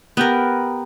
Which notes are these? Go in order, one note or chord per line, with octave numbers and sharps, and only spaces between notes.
B3 G4 A#4